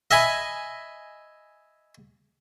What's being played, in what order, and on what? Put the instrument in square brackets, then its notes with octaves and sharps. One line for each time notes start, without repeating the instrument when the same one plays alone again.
[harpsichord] D#5 E5 G#5 B5